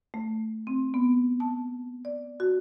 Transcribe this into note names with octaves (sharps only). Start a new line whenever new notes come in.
A3
C4
B3
A5
D5
F#4